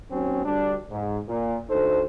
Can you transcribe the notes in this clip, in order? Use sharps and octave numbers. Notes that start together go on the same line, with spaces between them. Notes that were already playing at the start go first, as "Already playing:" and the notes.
D#2 F#3 C4 C#4
D2 G3 D4
G#2
A#2
D2 D#4 A4 C5